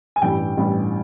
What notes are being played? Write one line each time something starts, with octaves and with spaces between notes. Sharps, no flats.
G#5
A1 G2 E3 G3 G5
A1 G2 E3 G3